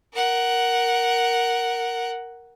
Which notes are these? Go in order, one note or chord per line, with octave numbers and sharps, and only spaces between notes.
A#4 F#5